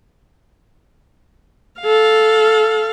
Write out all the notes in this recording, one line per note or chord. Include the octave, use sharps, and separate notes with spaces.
A4 F5